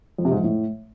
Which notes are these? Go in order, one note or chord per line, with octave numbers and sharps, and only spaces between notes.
F2
C3
G#2
F2
A2